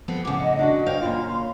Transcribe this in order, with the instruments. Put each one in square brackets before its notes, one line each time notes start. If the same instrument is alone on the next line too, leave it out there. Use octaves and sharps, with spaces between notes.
[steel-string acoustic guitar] F2 B3 C4
[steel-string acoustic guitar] A2 C#3 [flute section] F#5 D6
[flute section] D#5 [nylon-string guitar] F#5
[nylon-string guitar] D4 D#4 F#4
[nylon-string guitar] C5 C#5 G5 [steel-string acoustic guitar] F5
[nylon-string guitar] A#2 C#3 F4 [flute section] C6